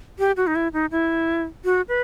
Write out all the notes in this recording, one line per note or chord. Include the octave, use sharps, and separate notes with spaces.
G4
F#4
D#4
E4
D#4
E4
F#4
B4